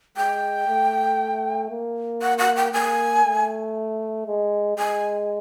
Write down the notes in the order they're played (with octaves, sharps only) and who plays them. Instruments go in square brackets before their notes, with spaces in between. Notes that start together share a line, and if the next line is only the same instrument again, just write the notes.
[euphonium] G#3 [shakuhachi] G5
[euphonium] A3
A#3
[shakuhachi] F#5
F#5
G5
[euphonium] A#3 [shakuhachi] G#5
[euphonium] A3
G#3
[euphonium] G#3 [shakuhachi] G#5